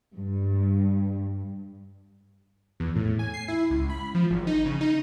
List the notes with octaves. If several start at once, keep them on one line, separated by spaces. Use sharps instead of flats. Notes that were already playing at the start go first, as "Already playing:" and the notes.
G2
E2
A2
G#5
C7
E4
C#2
B5
F3
G#1
D#4
C#3
D#4